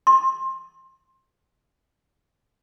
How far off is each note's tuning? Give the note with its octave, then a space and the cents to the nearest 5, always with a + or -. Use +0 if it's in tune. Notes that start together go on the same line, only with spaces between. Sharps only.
C6 +20